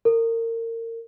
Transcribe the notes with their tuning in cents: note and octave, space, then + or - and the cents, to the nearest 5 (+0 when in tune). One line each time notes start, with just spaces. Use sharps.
A#4 -30